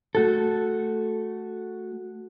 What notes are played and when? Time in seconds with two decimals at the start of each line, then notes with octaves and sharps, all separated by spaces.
0.15 A3 F#4 A4